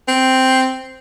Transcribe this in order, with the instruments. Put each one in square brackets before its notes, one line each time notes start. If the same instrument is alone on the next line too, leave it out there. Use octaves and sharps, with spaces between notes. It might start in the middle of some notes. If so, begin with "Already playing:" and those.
[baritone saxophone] C4